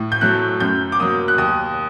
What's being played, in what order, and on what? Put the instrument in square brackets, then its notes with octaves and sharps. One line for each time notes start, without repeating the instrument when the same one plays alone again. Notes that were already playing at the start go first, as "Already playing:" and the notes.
Already playing: [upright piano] A2
G6
F#3 A3 F#6
F#2 G6
D6
F#3 A#3 D#6
F#6
D#2 D#6